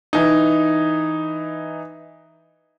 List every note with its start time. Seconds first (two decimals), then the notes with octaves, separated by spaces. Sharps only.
0.13 E3 D#4